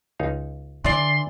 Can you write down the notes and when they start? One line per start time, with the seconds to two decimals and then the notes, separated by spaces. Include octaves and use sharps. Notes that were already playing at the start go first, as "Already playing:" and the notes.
0.20 C#2 D#4 F5
0.85 D3 E3 D5 C6